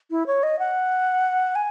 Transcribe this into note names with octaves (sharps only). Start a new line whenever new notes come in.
E4
C#5
D#5
F#5
G#5